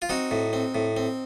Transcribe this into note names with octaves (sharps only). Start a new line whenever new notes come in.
F4
C4 D#4 F#4
A2
C4
A2
C4